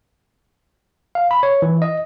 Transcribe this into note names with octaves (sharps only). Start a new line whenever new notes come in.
F5
B5
C#5
E3
D#5